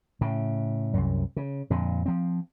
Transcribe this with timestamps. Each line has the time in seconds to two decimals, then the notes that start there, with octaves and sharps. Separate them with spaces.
0.21 A2 C#3
0.94 C2 F#2
1.37 C#3
1.70 F2 A#2 D3
2.06 F3 C4